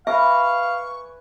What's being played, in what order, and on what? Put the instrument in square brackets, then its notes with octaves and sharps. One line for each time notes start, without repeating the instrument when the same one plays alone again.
[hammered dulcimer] B4 G#5 D6 [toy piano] E5 [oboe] F5 [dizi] C#6